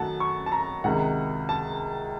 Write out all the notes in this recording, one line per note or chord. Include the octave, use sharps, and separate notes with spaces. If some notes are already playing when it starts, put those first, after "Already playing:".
Already playing: F#2 D#3 F#3 A3 F#5 A5
C#6
A5
A#5
C#2 C3 D#3 F#5
A5